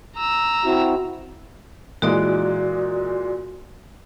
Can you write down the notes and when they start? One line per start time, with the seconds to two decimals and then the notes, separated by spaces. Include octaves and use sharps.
0.17 A#5 E6
0.65 C4 E4 F#4
2.02 A#2 E3 G#3 F#4 D5